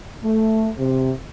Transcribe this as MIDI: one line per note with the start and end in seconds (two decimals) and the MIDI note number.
0.23 0.70 57
0.79 1.11 48